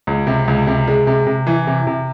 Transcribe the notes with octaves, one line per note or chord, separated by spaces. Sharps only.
C#2
C3
C#2
C3
G#3
C3
C3
E3
C3
C3